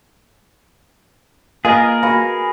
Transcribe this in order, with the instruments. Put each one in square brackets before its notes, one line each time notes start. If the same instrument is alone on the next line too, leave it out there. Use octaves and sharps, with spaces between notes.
[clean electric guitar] A#3 [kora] F4 B4 D#5 [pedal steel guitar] G#4 A#4 [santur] G#5
[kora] F#4 [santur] B4 F5